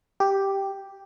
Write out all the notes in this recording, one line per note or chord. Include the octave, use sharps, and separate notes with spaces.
G4